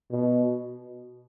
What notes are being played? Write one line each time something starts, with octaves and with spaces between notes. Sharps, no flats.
B2